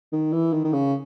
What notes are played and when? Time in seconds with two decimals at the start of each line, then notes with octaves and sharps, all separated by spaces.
0.13 D#3
0.33 E3
0.53 D#3
0.64 D#3
0.73 C#3